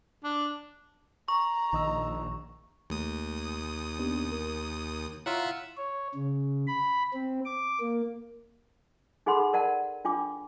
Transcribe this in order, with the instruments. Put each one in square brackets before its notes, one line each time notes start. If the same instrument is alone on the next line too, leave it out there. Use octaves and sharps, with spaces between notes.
[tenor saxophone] D4
[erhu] A#5 [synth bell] C#6
[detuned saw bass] A#1 [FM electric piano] D#3 D#5 E6
[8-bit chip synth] D#2 D#6 [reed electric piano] A3
[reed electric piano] B3 D4 G4
A#4
[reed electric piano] E4 C#5 A#5 [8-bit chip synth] F4 E5 F#5
[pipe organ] C#5
C#3
B5
C4
D6
A#3
[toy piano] D#4 G#4 A4 F#5 B5 C6
A#4 D5 F#5 A5
D4 F4 G5 D6